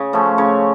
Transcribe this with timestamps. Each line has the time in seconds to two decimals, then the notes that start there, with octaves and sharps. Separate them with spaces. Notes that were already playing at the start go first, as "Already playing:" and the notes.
Already playing: C#3 C#5
0.13 F3 A3 C#4
0.38 C#3 C#5